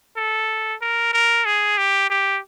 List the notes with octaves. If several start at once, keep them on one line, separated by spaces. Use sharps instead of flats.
A4
A#4
A#4
G#4
G4
G4